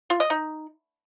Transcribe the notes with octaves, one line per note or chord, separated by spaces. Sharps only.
F4
D#5
D#4